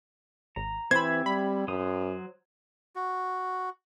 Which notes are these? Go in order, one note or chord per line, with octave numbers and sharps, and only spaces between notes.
G#1 A#5
E3 C4 G4 C5 E5 B5 G#6
G3 B5
F#2 F#3 C5 D#6
F#4